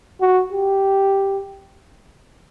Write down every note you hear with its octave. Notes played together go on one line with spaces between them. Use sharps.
F#4
G4